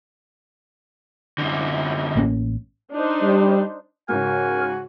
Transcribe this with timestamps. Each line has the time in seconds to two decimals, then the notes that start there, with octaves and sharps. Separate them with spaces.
1.38 F#2 D3
2.15 A1 A#3 C#4
2.94 D4 D#4 C5
3.22 G3
4.09 G#2 C#3 F#4 A#4 G#5